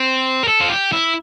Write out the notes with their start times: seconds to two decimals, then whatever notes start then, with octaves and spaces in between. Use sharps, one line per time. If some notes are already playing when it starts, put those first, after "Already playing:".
Already playing: C4
0.43 A#4
0.48 A4
0.61 F4
0.70 G4
0.92 E4